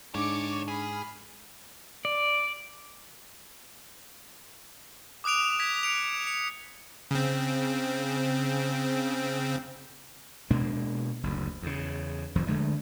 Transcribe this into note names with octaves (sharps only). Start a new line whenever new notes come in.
G#2 D3 D4 C#5 D6 C#7
G#4 B5 F6
D5
D6 D#6 F#6 D7 F7
G#6 B6
F#6 C#7 D7 F7
C#7
C#3 C4
B2 G#3 A#3 D4
F#1 D2
E2 C#3
F1 F2 D#3 F3
D3 G#3 A3